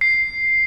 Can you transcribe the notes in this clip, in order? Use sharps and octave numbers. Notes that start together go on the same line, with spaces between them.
C7